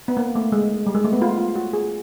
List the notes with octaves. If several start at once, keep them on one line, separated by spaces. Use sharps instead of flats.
B3
A#3
A3
G#3
G3
G#3
A3
B3
F4
F4
F#4
G#4